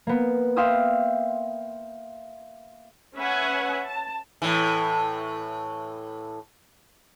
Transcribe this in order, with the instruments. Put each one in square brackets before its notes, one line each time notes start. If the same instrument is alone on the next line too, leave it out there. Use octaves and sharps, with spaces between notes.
[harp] A#3 B3
E5 F5 G5 C6 D#6 E6
[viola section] C#4 B4 E5 F#5 G#5
A5
[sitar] A2 E3